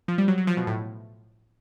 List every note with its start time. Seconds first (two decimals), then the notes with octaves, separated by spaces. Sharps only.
0.08 F3
0.18 G3
0.28 F#3
0.38 F#3
0.47 F3
0.57 B2
0.67 A2